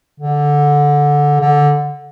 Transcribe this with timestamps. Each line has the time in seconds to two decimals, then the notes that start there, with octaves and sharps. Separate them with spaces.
0.20 D3
1.40 D3